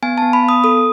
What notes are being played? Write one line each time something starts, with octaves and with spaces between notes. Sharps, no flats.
B3 G#5
A5
B3
B5
B3
D#6
A4 D#6